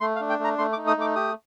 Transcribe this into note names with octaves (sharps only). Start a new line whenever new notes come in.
A3 C6
F5
D4
G5
A3 A#5
A3 C6
D6
D#4
D#6
A3 D6
G4 D#6